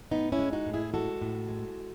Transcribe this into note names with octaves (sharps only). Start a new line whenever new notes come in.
A2 B3 D#4
C#4 E4
G#3
D#4 F#4
A2
E4 G#4
G#3 F#4 A4
A2
G#3